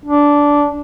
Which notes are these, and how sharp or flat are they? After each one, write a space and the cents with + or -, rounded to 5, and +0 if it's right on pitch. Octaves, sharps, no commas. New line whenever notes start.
D4 -10